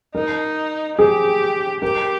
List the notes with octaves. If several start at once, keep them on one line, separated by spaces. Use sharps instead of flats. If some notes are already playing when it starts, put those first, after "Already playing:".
D#4 A#4
G4 G#4
G4 A#4